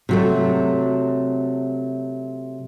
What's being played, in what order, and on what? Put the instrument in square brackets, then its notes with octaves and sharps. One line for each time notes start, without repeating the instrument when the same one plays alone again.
[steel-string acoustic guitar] C3 F#3 A3